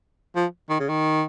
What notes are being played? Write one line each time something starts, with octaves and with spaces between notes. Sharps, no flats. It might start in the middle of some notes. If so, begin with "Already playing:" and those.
F3
D#3
C#3
D#3